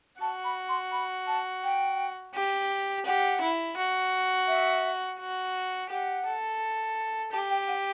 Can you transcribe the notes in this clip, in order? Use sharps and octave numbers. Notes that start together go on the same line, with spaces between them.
F#4 A5
B5
C6
B5
A5
G5
G4
G4 F#5
E4
F#4
E5
F#4
G4 F#5
A4
G4 A5
G5
F#5